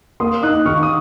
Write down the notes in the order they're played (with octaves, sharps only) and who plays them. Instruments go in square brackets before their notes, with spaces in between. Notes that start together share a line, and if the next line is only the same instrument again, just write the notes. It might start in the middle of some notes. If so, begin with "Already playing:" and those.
[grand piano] A#3 [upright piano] C6 D#6
[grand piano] D#4 [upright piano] D#6 F#6
[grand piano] D#3 [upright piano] C#6 F6
[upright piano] D#6